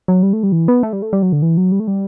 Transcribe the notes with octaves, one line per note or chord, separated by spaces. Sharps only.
F#3
G3
A3
G3
E3
B3
A3
G3
A3
G3
F#3
D3
E3
F#3
G3
A3
G3